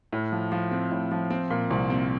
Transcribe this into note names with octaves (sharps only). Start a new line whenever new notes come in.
A2
F3
F3
C4
A2
F3
C4
A#2
C2
C4